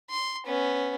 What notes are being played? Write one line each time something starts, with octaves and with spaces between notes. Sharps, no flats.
C6
B3 C#4